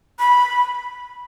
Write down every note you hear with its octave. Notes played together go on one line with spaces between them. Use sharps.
B5